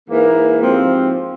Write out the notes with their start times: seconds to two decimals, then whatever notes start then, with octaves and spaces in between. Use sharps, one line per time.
0.08 G#2 E3 A#3
0.59 G#2 F3 C4 G4